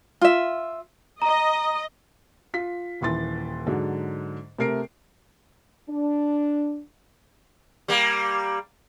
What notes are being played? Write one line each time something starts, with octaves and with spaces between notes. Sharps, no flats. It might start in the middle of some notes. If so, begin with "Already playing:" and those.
F4 E5
D#5 A#5
F4 B6
D#1 D#2 E3 C6 A6
G#2 D3 F#3
C3 A3 A#4 C7 D7
D4
G3 A#3